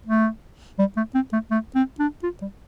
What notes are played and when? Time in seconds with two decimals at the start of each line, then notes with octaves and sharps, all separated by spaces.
0.06 A3
0.79 G3
0.97 A3
1.15 C4
1.33 A3
1.51 A3
1.75 C4
2.00 D4
2.23 F4
2.42 G3